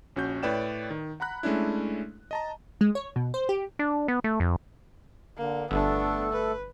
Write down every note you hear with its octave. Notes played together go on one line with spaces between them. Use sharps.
A#1 C#4 F#4 G6
A2 B4 C#5 D5 G5 E7
D#3
F#5 A#5 B5 F#6
G#3 A3 C#4 D4 E4
D#5 A5 A#5
G#3
C#5
B2
C5
G4
D4
B3
A3
F2
D3 A#3
G1 A3 B3 D4 A4
B4